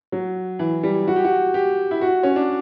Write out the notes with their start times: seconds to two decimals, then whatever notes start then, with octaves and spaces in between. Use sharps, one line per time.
0.12 F#3
0.59 E3
0.83 G3
1.08 F#4
1.16 G4
1.25 F#4
1.54 G4
1.91 E4
2.01 F#4
2.23 C#4
2.36 D4